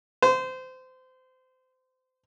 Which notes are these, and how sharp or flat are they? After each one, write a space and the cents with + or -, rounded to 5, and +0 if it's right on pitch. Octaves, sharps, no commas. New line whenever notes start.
C5 -25